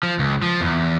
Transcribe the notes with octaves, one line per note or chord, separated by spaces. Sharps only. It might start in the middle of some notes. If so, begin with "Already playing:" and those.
F3
C#2
F3
E2